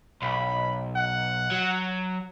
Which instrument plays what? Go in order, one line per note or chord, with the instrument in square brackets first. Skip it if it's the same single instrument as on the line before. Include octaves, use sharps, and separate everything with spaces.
[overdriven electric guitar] B1 [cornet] B5
[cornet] F#5
[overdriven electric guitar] F#3